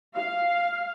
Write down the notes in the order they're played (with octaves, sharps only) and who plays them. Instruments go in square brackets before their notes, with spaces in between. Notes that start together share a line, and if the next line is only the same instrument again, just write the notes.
[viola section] F5